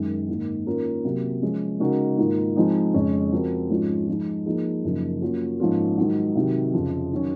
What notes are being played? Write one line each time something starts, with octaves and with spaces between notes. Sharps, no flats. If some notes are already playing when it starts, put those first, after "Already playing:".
Already playing: F#2 D#3 G#3
G#2 D#3 A#3
D#3 A#3 C#4 F4 A#4
C3 F#3 A#3
F3 G#3 C#4 G#4
C#3 G#3 D#4 F#4 A#4
G#2 D#3 A#3 F4 A#4
F3 G#3 C4 D#4
F2 C#3 G#3 C#4 G#4
F3 C4 F#4 A#4
G#2 F3 G#3 C#4 F4
F3 G#3 D#4
F3 A#3 D#4 G#4
F#2 C#3 F3 A#3 D#4
F#3 A#3 C#4 F4
G#2 F3 A#3 C#4 F4
G#2 D#3 F#3
C3 D#3 F#3
F2 C#3 F3
D#3 F#3 C#4